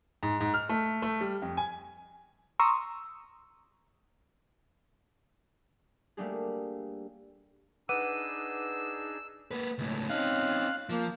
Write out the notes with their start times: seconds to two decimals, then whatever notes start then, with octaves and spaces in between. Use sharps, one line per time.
0.23 G#2
0.40 G#2
0.54 F6
0.69 A3
1.02 A3
1.21 G3
1.42 F2
1.57 G#5
2.60 A#5 C6 C#6 D#6 E6
6.17 G3 A3 A#3 D4 G4 G#4
7.89 D4 D#4 G#4 B4 F#5 D6 E6 D#7
9.51 A#3 B4
9.78 C#2 A2
10.10 C4 C#4 D#4 F5 F#6
10.89 F3 A#3